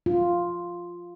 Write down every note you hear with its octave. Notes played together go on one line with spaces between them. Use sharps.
F4